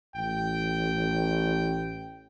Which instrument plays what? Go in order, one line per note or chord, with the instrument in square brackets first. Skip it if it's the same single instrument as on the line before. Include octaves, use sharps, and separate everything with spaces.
[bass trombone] A1 [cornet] G5